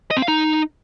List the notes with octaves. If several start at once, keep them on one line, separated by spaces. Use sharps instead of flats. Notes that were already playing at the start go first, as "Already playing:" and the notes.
D#5
C4
F5
D#4